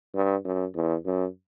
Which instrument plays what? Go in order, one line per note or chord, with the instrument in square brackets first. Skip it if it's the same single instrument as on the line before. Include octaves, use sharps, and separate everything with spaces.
[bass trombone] G2
F#2
E2
F#2